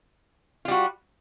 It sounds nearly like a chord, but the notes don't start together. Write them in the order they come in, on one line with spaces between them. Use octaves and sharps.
F4 G3 F#4